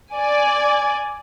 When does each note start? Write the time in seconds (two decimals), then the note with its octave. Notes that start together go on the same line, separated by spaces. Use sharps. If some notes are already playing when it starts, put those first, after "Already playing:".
0.13 D5 G#5